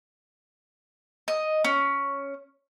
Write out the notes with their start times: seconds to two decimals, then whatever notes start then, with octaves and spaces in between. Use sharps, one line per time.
1.28 D#5
1.64 C#4